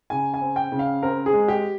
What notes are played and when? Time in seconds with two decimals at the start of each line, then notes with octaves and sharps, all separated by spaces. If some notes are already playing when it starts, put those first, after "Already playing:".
0.10 C#3 G#5
0.34 G#5
0.41 C4
0.56 G5
0.72 C#3
0.79 F5
1.02 C4 A#4
1.26 G#4
1.33 G#3
1.48 G4